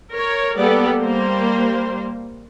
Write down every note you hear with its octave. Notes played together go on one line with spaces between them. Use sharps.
A#4 C#5
G3 A#3 B3 G4 A4 D5
G3 A#3 C5